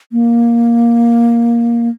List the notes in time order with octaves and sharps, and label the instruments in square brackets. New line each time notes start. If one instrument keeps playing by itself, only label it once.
[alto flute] A#3